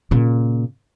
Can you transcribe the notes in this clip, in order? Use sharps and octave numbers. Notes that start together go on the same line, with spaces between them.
A#2 C#3